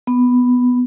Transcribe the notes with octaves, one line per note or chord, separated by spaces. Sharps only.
B3